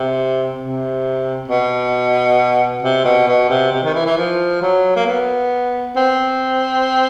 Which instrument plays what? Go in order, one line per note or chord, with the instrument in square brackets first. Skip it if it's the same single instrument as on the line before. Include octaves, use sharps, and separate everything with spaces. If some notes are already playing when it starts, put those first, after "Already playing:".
Already playing: [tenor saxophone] C3
C3
B2
C3
B2
B2
C3
C3
D#3
E3
E3
F3
F#3
A#3
B3
C4